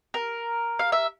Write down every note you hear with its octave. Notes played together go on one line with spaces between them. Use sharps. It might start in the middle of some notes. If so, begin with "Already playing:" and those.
A#4
F5
E5